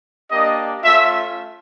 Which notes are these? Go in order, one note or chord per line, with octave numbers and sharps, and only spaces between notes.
A#3 D4 G4 D#5
A3 C#4 F4 E5